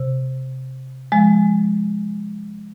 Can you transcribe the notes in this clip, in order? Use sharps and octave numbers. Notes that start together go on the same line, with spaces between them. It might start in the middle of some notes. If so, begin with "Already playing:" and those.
Already playing: C3
F3 G#3